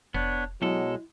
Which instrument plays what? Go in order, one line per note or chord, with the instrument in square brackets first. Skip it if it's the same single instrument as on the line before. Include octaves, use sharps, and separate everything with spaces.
[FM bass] F1 [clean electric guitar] B3 [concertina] D4 C#5
[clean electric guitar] B1 B2 A4 [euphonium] F#3 [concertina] G#3 [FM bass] E4